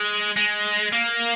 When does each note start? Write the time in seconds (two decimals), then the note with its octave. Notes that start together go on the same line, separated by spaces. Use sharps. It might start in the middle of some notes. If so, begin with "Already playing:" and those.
Already playing: G#3
0.37 G#3
0.92 A#3